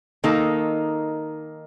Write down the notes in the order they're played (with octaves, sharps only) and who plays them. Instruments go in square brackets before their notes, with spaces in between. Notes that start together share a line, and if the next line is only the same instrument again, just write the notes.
[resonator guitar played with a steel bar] D#3 A#3 D#4 A4